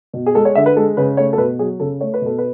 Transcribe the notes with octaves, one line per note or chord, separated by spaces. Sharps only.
B2
G#4
G#3 A4
C#5
D3 E5
B4
G#3 A4
C#3 B4
A3 C#5
A4
B2 B4
F#3 G#4
C#3 A4
A3 C#5
B4
B2 A4
B4